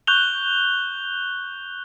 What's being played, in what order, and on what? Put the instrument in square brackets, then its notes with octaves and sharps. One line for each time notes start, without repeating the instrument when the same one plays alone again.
[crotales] C#6 F#6 G6 F7 G7